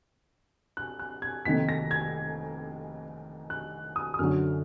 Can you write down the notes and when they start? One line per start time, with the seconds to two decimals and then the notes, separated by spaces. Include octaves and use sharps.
0.77 F#6
0.99 F#6
1.22 G#6
1.45 F1 F2 D#3 A#3 B6
1.69 A#6
1.91 G#6
3.50 F#6
3.96 D#6
4.14 D#6
4.19 F#2 D3 F#3 F6